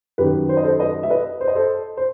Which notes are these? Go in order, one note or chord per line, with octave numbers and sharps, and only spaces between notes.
F#2 D#3 G4 B4
C5
D#5
A4 C5
B4 D#5
E5
B4 D#5
C5
D#5
A4 C5
C5